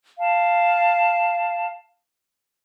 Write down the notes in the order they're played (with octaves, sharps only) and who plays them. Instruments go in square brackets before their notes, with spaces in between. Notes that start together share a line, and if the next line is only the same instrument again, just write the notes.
[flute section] F5 A5